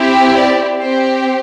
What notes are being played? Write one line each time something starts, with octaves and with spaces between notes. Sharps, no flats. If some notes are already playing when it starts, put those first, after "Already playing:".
Already playing: C4 E4 G4
D5
C4 G4 C5